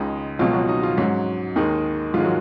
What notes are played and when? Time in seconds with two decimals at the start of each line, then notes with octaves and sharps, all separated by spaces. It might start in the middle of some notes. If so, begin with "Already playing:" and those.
Already playing: C#2 C#3 G#3 D#4
0.39 C#2 B2 F3 F#3 F4
0.54 F#3 F#4
0.69 D#4 D#5
0.83 F3 F4
0.97 G#2 F#3 C#4
1.56 D#2 D#3 G#3 D#4
2.14 G#2 D#3 F3 G#3 F4
2.24 F#3 F#4